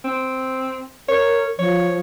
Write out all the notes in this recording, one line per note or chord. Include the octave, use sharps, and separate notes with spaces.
C4
A#4 C#5
F3 C#5